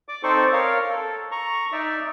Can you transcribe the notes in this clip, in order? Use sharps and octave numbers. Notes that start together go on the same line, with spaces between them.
D5 D6
C4 D#4 A4 C5 D5 C#6
A#4 C#5 F5
A4
A#5 C#6
D#4 D5 E5